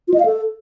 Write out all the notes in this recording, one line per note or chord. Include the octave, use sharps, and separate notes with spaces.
F4
D#5
F5
A4